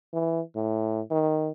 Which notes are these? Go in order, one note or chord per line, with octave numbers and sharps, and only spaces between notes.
E3
A2
D#3